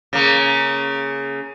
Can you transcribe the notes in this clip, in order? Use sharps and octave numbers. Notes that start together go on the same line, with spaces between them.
C#3 A#3